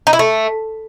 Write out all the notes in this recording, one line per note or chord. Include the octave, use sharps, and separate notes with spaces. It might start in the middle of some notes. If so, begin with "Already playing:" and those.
D#4
E4
A3